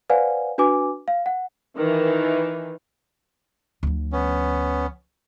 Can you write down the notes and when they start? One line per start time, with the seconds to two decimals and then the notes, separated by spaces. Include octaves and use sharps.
0.10 B4 C5 D5 F5 F#5 G#5
0.58 D4 F#4 B4 G#5 D6
1.08 F5
1.26 F#5
1.76 D#3 E3
3.83 D2 F3
4.13 B3 C#4